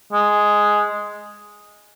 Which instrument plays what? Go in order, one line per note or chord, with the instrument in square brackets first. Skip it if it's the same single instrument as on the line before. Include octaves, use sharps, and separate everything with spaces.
[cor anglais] G#3